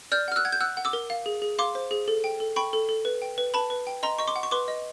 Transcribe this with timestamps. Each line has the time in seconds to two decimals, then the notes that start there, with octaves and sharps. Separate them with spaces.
0.12 D5 F6 G6
0.28 F#5 F6
0.36 E6 F#6
0.45 F#5 G#6
0.52 G6
0.60 F#5 E6 F#6
0.77 F#5
0.85 D6 E6
0.93 A#4
1.10 F5
1.26 G#4
1.42 G#4
1.59 F5 C6 D6
1.75 C5
1.91 G#4
2.08 A4
2.24 G5
2.40 A4
2.56 G5 B5 C#6
2.73 A4
2.89 A4
3.05 B4
3.22 G5
3.38 B4
3.54 B4 A5 B5
3.70 B4
3.87 G5
4.03 D#5 A#5 C6
4.19 D#5 C#6
4.27 C6 D6
4.36 F#5
4.43 C#6
4.51 B4 C6 D6
4.68 D#5